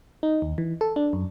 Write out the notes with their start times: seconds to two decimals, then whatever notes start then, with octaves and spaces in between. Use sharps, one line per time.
0.23 D#4
0.42 D#2
0.58 E3
0.81 A4
0.96 D4
1.13 F#2